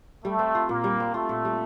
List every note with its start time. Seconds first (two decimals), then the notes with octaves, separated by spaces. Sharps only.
0.24 G3 A3
0.39 C4
0.55 F4
0.69 A#2 A#3
0.84 G3
1.00 C4
1.14 A3 F4
1.29 A#2
1.45 G3